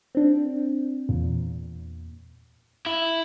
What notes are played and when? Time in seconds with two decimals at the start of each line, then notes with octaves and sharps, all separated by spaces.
0.15 C4 D4
1.09 E2 A#2
2.86 E4